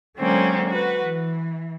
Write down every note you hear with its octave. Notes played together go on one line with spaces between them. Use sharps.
D3 F#3 G#3 A#3 C4 C#4
F#4 B4
E3